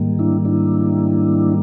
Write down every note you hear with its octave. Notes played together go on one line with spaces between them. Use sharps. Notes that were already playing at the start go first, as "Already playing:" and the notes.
Already playing: G#2 D#3 G3 A#3
D4 E4
D4 E4